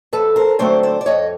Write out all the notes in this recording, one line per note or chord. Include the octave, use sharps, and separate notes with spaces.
F2 A4 B4
A#4 C5
D3 F#3 A3 C4 C5 D5
C5 D5
D5
F2 C#5 D#5